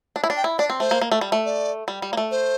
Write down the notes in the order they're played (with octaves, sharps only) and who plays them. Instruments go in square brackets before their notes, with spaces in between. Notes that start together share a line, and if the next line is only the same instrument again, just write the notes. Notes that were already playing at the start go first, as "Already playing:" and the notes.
[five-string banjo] D4
E4
D4
[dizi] G5
[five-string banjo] E4
[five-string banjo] D4 [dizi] D5
[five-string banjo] C4
[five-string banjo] A3 [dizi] C5
[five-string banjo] A#3
A#3
A3
G3
A3
[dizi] D5
[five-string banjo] G3
G3
A#3
A3
[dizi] C5